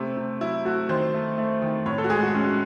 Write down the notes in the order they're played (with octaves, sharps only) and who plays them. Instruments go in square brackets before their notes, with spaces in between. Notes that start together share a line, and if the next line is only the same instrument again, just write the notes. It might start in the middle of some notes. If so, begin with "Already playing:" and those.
Already playing: [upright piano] C3 A3 C5
C3
F#3 E4
A3 F#4
D#3 C5
A3
A3
D#3
A2 C#5
A4
F#4
G#3 G#4
F#4
G#3 C#4